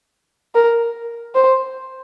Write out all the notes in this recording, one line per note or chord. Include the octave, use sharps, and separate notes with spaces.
A#4
C5